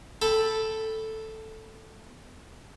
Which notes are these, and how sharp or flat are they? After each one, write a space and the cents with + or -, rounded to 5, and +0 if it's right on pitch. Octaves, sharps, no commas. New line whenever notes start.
A4 +0 G5 +20 B5 +0